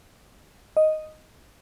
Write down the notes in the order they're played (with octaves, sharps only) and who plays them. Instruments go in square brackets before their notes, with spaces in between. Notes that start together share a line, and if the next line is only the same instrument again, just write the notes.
[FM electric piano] D#5